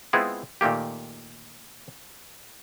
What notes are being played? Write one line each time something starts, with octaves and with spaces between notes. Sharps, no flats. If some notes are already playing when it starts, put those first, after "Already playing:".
G#3 B3 C4 E4 F4 G#4
A#2 D#3 A3 A#3 G4